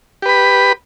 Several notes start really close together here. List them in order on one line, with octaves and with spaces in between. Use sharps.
G4 B4 B5